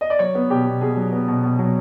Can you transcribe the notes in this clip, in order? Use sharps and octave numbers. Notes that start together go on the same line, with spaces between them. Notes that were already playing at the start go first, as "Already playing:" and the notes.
D#5
D5
F#3 C#5
B3
B2 G4
B2
B2 G#4
F#3
B3
B2
B2
F#3